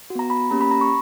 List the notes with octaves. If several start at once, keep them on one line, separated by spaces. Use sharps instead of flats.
F#4
B3 A#5
B5
A#3 C#4 G4 A#5
B5
A#5
C#6